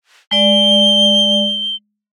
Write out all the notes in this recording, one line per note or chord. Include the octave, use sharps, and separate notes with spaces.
G#3 D5 G7